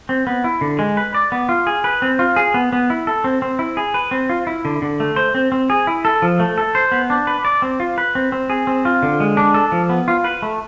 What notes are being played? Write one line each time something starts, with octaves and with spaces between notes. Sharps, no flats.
C4
B3
E4
D3
G#3
B4
D5
B3
F4
G#4
B4
C4
F4
G#4
B3
B3
E4
A4
C4
C4
E4
G#4
B4
C4
F4
E4
D3
D3
A3
C5
C4
C4
G#4
E4
A4
F3
A3
A4
C5
B3
D4
B4
D5
C4
F4
B4
C4
C4
G#4
C4
F4
D3
G#3
D4
A4
F3
B3
F4
B4
A3